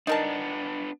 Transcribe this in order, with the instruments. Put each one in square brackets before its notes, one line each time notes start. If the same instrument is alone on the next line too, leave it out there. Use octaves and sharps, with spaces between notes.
[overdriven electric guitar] B3 D4 [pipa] D#4 A#4 A5